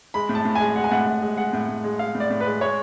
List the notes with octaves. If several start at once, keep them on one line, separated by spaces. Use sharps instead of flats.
G#3 B5
A2
A5
A2
G#3 G#5
G#3 F#5
G#5
A2 F#5
A2
G#3
G#3 F#5
A2
A2
G#3
G#3 F5
A2
D5
A2
B4
G#3
G#3 C#5